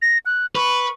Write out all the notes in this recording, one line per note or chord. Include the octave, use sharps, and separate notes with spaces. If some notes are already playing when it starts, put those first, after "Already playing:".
A#6
F#6
B4 C#6